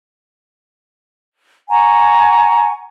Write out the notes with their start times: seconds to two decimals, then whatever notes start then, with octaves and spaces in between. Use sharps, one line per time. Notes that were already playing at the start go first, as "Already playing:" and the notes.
1.69 F#5 G#5 A#5 C#6